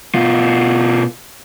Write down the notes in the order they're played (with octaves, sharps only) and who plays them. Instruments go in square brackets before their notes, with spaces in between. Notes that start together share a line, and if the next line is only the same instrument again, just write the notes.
[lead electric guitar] B2 F4